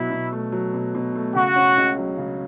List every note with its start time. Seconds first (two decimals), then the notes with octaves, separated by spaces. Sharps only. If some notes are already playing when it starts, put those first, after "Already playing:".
Already playing: B2 F#3 E4
0.11 B2
0.32 A3
0.52 F#3
0.74 B2
0.95 B2
1.15 A3
1.35 C#3 F#4
1.56 C#4
1.77 C#2
1.98 F#3
2.18 C#3